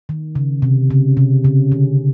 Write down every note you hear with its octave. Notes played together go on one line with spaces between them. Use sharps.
D#3
C#3
C3
C#3
C3
C#3
D3